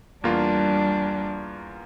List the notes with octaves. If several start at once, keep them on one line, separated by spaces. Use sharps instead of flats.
E2 G3 A#3 D4 F4